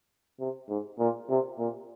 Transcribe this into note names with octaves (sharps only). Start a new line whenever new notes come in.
C3
G#2
A#2
C3
A#2